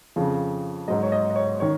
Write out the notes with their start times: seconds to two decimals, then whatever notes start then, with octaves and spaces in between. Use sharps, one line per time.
0.16 F2 C#3 F3
0.88 G#2 F#3 D#5
1.03 C#5
1.12 D#5
1.30 D#5
1.36 C#5
1.60 D#3 C#5